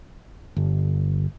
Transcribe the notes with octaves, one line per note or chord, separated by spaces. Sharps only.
G1